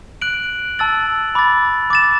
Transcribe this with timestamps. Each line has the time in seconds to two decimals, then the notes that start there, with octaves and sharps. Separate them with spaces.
0.22 F#6 D7 F#7
0.79 A5 E6 A6 F#7
1.35 B5 D6 A6
1.90 D6 A6 E7